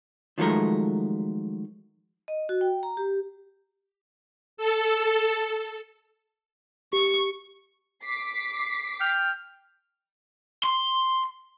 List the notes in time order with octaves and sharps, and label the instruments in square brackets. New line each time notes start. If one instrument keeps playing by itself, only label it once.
[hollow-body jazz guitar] D#3 F3 F#3 G#3 A3 A#4
[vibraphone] D#5
F#4
G5
A#5
G4
[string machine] A4
[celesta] G4 [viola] C#6
[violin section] D6 B6 C7
[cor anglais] G5 [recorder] F6
[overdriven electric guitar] C6